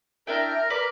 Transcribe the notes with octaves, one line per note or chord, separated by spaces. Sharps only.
D4 E4 A#4 G5
B4 D5